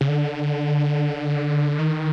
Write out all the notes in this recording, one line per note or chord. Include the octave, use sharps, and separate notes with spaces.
C#3
D3
D#3